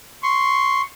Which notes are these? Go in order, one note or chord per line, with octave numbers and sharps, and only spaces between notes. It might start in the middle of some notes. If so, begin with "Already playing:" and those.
C6 C#6